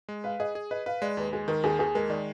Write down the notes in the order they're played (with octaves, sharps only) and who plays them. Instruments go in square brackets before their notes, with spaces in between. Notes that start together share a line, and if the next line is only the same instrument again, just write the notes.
[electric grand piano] G#3
[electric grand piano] B4 [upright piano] F5
[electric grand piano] G#4 [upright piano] D#5
[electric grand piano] G#4
[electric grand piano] B4 [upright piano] D#5
[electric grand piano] B4 [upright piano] F5
[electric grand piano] G#3 [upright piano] D5
[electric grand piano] D#2 [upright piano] B4
[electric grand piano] G#3 [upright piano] G#4
[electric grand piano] D#3 [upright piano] A#4
[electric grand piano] D#2 [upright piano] G#4
[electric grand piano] D#2 [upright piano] G#4
[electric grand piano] G#3 [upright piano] A#4
[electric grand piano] D#3 [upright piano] D5